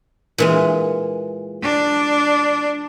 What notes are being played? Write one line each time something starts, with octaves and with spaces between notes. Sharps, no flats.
A#2 E3 G#3
D4